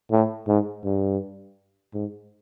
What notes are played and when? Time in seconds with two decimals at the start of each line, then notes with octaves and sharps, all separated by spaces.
0.11 A2
0.48 G#2
0.84 G2
1.94 G#2